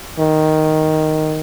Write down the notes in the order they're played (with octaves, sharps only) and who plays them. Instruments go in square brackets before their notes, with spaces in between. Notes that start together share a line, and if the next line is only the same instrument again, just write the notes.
[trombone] D#3